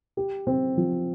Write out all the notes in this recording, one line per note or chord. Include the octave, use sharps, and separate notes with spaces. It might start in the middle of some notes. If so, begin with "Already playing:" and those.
G4
C4
F3